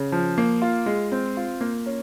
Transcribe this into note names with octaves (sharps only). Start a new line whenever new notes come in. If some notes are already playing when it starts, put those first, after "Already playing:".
Already playing: C#3
F3
A#3
F4
G#3
C4
F4
A#3
C#4